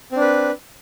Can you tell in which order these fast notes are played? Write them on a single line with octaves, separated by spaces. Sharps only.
C4 D4 B4